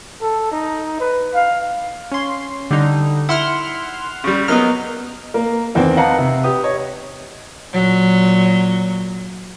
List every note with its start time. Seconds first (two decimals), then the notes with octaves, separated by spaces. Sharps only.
0.21 A4
0.51 D#4
1.00 B4
1.34 F5
2.12 C#4 C6
2.71 D3 G3 D#4
3.29 E4 F#5 C6 F6
4.24 C#3 G3
4.48 F#3 A#3 B3 D#4 F6
5.34 A#3
5.75 E2 D#3 C4
5.96 D#4 B4 F5 F#5 A5 A#5
6.18 C3
6.44 G4 B4 D#6
6.64 C#5 D#5
7.74 A#2 F#3